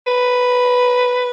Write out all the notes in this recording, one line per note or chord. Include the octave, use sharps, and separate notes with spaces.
B4